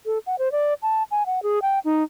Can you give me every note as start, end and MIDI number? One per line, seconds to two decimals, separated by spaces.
0.06 0.18 69
0.27 0.36 78
0.39 0.51 72
0.52 0.74 74
0.82 1.03 81
1.11 1.23 80
1.26 1.43 78
1.43 1.59 68
1.62 1.79 79
1.85 2.03 63